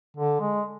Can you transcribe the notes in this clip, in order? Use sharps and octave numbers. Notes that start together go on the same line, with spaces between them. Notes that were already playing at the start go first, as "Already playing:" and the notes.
D3
G#3